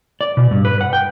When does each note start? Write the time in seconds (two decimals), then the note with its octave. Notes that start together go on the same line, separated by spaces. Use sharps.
0.21 D5
0.37 B2
0.51 G2
0.65 B4
0.81 F#5
0.93 G5